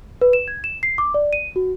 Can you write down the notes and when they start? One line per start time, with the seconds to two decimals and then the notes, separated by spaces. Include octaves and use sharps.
0.21 B4
0.33 E7
0.48 G#6
0.64 E7
0.83 C7
0.98 D6
1.14 D5
1.33 D#7
1.56 F#4